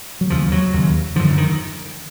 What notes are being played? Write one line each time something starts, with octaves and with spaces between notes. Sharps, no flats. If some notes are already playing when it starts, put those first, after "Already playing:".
F#3
D#2 C#3 F3
F#3
D#2 C#3
F#2 D3 F3
D#3